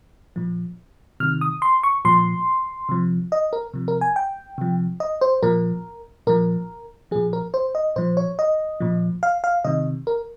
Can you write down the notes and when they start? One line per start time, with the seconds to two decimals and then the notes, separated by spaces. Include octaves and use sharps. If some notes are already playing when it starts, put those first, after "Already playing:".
0.36 A#2 F3
1.20 C3 D#3 F6
1.41 D#6
1.62 C6
1.83 C#6
2.05 A#2 F3 C6
2.89 C3 F3
3.32 D#5
3.53 A#4
3.74 C3 F3
3.88 A#4
4.01 G#5
4.16 G5
4.58 C3 F3
5.00 D#5
5.21 C5
5.43 A#2 F3 A#4
6.27 A#2 F3 A#4
7.11 A#2 F3 G#4
7.33 A#4
7.54 C5
7.75 D#5
7.96 A#2 F3 C5
8.17 C#5
8.39 D#5
8.80 A#2 F3
9.23 F5
9.44 F5
9.64 C3 D#3 D#5
10.07 A#4